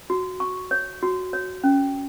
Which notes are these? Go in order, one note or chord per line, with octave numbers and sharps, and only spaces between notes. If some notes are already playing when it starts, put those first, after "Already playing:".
F#4
C#6
C#5
F#4
C#5
C#4